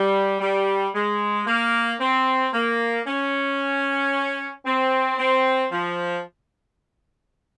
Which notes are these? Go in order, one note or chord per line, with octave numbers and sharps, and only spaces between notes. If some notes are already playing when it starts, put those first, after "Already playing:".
Already playing: G3
G3
G#3
A#3
C4
A#3
C#4
C4
C4
F3